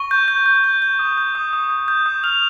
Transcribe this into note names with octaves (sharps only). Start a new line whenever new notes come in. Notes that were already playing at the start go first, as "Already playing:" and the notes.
Already playing: C#6 G7
G6
G6
G6
G6
G6
D#6
G6
D#6
D#6
G6
G6
D#6
F6 F7